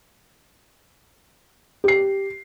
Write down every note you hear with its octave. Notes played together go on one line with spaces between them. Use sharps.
G4 C7